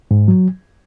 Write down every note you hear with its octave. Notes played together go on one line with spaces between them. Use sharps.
G#2
F#3